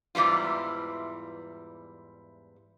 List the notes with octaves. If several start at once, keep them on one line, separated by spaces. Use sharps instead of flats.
E2 G#2 E3 G3 F4